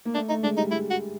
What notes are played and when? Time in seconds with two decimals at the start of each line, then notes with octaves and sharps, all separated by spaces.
0.05 A#3
0.14 A3 D4
0.29 A3 D#4
0.43 G#3 D4
0.57 G3 D#4
0.71 G#3 E4
0.90 F#4